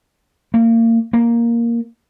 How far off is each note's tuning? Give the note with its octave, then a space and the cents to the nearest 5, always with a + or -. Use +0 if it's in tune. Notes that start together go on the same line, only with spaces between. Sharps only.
A#3 -30
A#3 +5